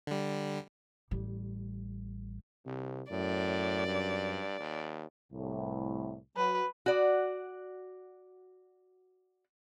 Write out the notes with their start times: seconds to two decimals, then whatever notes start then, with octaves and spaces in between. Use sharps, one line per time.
0.07 D3 G3
1.11 A1 G3
2.66 C2 C3
3.11 F#2 A2 D5
3.87 G2
4.59 D#2
5.32 C2 A2
6.37 F#3 B4
6.86 F#4 D5